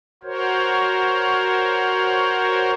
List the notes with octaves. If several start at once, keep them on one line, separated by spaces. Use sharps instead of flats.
F#4 A#4 C5 C#5